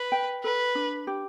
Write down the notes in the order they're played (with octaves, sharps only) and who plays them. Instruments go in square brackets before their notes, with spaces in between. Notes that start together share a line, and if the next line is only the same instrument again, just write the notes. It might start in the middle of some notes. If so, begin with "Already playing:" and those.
Already playing: [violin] B4
[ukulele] G5
[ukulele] A4 [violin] B4
[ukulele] D4
G4